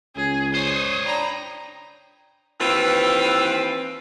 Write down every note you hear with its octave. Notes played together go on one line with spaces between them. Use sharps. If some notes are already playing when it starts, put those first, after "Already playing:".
C#2 C#4 G#4
C5 C#5 D#6
D4 G5 A#5 B5
D#2 E3 C4 E4 F4 B4